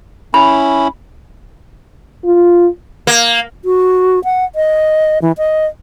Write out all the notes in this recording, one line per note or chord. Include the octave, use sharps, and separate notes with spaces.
C#4 E4 B5
F4
A#3
F#4
F#5
D#5
E3
D#5